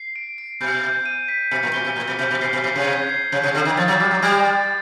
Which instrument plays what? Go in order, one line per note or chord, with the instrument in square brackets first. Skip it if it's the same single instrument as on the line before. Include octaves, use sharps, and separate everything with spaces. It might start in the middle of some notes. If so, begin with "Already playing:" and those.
Already playing: [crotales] C7
D7
D7
[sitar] B2 [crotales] G6
[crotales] G6
D#7
B6
[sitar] B2 [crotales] C#7
[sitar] A#2
[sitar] B2 [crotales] G7
[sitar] B2
[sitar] A#2 [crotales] G6
[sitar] B2
[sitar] B2 [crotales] G6
[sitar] B2
[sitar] B2 [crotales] C7
[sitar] B2
[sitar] B2 [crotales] C7
[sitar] C3
[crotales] G#6
C7
[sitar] C3 [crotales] G6
[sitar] C3
[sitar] D3 [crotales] C7
[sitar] D#3
[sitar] F3 [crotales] A6
[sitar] F#3
[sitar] G3 [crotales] D6
[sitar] F#3
[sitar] G3 [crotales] D7
[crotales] A6